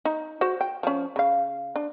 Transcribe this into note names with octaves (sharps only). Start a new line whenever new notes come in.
D#4
F#4 C5
G5
F3 C#4
C#3 F5
D4